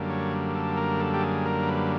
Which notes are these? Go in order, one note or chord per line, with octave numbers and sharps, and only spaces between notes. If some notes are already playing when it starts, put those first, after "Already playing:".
Already playing: F#2 D3 G3 A#3
C#5
A4
A#4
A4
G4
G#4
A#4
B4